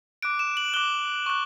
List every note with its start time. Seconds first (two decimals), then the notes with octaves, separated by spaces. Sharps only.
0.22 D6 F#6 D7
0.39 E7
0.57 F#7
0.74 D6 F#6 G7
1.26 C#6 F#6